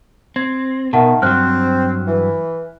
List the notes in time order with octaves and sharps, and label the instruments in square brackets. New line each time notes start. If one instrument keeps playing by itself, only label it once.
[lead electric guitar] C4 [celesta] G#6
[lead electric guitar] B2 [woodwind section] D#3 [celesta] E5 F#5 A5
[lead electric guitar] G2 F#3 [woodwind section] C4 [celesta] F6 F#6
[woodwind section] E3